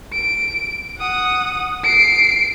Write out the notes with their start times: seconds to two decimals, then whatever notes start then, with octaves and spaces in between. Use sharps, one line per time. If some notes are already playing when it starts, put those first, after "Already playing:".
0.13 D7
0.98 F#5 D#6
1.84 C7 D7